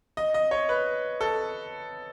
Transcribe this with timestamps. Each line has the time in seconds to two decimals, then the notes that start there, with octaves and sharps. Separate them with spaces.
0.17 D#5
0.34 D#5
0.51 C#5
0.69 B4
1.21 A4